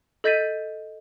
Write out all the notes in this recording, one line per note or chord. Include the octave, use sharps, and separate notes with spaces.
A4 D#5 G6 A6 B6 D#7